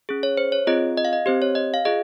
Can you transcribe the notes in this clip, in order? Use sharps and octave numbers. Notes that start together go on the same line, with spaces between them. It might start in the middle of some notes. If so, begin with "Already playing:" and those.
C#4 G#4
C#5
C5
C#5
C4 F4 G#4 D#5
D#5
F5
D#5
C4 G4 C5
C#5
D#5
F5
F4 G#4 D#5